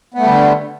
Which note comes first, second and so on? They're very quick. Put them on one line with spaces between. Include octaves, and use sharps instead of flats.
B3 A3 G3 D3